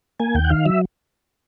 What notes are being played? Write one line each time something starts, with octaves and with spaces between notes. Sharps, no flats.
A#3 G#5
D#2 G5
F#5
D#3 F5
F#3 E5